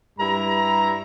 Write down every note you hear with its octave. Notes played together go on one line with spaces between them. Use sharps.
G2 G3 E4 A#5